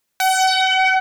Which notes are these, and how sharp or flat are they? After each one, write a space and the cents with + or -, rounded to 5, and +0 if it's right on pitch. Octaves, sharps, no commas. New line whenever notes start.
F#5 +35